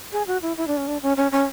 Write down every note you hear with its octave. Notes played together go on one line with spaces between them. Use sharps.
G#4
F#4
E4
E4
D4
C#4
D4
C#4
C#4
C#4